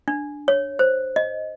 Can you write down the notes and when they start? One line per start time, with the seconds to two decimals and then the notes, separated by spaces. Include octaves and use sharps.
0.08 D4
0.48 C#5
0.79 C5
1.16 D#5